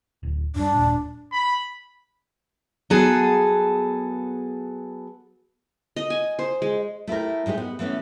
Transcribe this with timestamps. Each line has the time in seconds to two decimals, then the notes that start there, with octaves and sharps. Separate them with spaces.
0.23 D1
0.56 F#2 G3 D4
0.75 D#1 A#2
1.32 B5
2.90 F#3 B3 G#4 A4
5.96 D#5
6.10 G#5
6.39 C5
6.62 G#3
7.07 A3 E4 G4 A#4
7.46 A2 G#3 D#4 G4
7.58 B3
7.79 E3 A3 B3 C#4